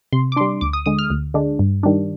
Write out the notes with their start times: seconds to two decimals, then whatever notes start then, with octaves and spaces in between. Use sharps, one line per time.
0.13 C3 C6
0.32 D6
0.37 D4 C6
0.41 G3
0.61 D2 D6
0.73 D#6
0.86 D3 G#3 D#6
0.99 F6
1.10 D2
1.34 D3 G#3 D4
1.59 G2
1.83 D#3 G3 D4